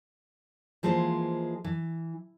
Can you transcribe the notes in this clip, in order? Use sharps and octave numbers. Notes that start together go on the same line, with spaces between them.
E3 F3 G#3 A#3 E4 C5
E3